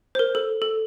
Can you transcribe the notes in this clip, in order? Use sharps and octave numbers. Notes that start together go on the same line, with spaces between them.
C5
A#4
A4
A4